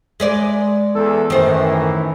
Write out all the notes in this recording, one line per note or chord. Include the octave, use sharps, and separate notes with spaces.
G#3 B4 D5
E2 A4
F#2 A2 D#3 E3 C5